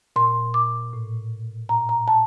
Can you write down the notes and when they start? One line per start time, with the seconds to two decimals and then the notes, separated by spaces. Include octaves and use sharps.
0.16 A#2 C6
0.54 D6
0.93 A2
1.69 A#2 A#5
1.89 A#5
2.08 A5